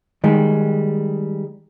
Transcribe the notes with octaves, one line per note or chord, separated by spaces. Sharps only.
D#3 G3 G#3